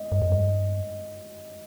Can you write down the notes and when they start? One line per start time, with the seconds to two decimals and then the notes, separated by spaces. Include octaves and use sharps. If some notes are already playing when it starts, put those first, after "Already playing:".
Already playing: D#5
0.12 G2
0.22 F2
0.32 G2